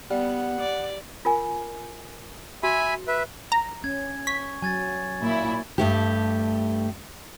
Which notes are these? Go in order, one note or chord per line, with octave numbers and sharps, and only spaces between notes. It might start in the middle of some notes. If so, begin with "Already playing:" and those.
G3 B3 F#5
D5
F4 A#4 G#5
F#4 E5 G#5 B5
B4 E5
A#5
C#4 G#6
C#6 B6
F#3 G#5 G#6 A6
A#2 E4
G2 A3 G4